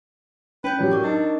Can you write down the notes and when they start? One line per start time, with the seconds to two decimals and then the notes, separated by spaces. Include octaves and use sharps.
0.64 C#4 B4 G5 G6
0.78 A2 F#3 G4 D5
0.92 A#4 C#6 D6
1.04 D4 D#4 D#5